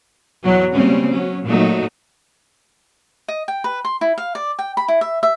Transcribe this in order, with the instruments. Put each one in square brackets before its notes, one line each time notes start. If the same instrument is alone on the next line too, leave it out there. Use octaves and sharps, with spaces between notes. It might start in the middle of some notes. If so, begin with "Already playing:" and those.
[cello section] E2 B2 F#3
C#3 G3 G#3 A#3 C4 C#4
F#3 C#4
A#2 F#3 A3 D#4
[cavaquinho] D#5
G5
B4
C6
E4
F5
D5
G5
B5
E4
E5
E5